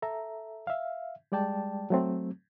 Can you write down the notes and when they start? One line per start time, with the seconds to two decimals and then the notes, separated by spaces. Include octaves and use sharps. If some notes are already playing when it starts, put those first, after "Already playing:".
0.02 A4 E5 A#5
0.67 E5 F5
1.32 G3 G#3 D5 G5 A5
1.90 F#3 A3 C4